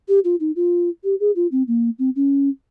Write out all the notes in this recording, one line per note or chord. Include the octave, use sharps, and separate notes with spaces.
G4
F4
D#4
F4
G4
G#4
F4
C4
A#3
C4
C#4